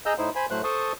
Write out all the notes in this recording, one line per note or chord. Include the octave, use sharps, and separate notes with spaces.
G#4 D#5 A#5 E6 G6
A2 D#4 E4 C5
C5 G#5 B5
A2 F#3 A3 C5 F#6
A4 C5 A5 C6 C#6 D#6